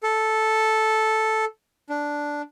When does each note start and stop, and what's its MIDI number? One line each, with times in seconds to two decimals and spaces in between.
0.03 1.45 69
1.90 2.42 62